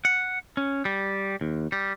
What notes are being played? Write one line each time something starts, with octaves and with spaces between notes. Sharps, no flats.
F#5
C#4
G3
D#2
G3